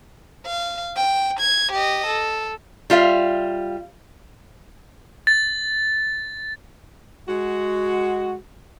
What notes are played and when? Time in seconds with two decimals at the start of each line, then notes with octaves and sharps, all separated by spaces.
0.46 F5
0.96 G5
1.40 G#6
1.72 G4 D#5
2.06 A4
2.90 G3 F4 E5 F5
5.27 A6
7.29 G#3 F#4